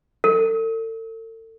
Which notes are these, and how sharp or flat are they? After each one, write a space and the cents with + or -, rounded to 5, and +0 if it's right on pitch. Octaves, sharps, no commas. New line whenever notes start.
A4 +35